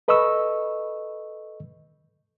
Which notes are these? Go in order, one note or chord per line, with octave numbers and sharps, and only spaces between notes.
A4 B4 D#5 B5 C#6 E6